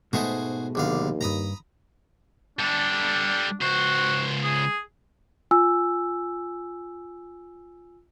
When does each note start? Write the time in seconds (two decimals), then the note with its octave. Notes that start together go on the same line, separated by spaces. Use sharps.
0.13 G#2 B2 G#3 A3 F#4 G#4 C5
0.75 A#1 D#2 D3 F5
1.21 C2 G2 A#5 B5 D#6
2.59 G3 D4 A4
3.61 C#2 F#4 C5
4.43 G#4
5.51 F4 G#5 E6